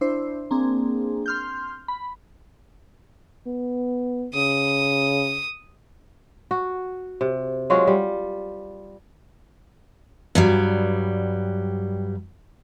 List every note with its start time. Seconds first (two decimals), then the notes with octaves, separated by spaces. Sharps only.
0.01 D4 E4 C5
0.51 A#3 C4 D4 G#4
1.26 C6 F6 G6
1.88 B5
3.47 B3
4.34 C#3 D#6
6.51 F#4
7.21 C3
7.70 F#3 G#3 F4 F#4
7.87 G3
10.35 G2 F#3 G3